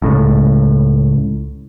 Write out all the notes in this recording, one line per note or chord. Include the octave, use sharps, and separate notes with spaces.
C#2 A2